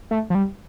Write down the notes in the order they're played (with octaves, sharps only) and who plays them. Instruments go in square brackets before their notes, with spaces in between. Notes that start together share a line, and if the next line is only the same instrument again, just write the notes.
[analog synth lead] A3
F3
G3